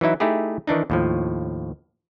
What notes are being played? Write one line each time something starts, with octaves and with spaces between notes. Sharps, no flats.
E3 F#3 D#4 E4
A3 D#4 E4 G4 G#4
D#3 E3 D4 D#4
D#2 A2 F3